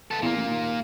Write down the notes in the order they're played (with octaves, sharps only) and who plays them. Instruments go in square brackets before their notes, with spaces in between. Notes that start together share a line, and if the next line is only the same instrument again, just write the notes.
[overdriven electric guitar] B3 A4
[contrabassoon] E2 [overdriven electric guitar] A#2 A#3
[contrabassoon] A1
D#2